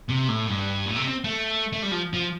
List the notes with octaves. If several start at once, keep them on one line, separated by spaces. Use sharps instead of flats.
C3
A2
G2
A2
C3
C4
A3
A3
G3
F3
F3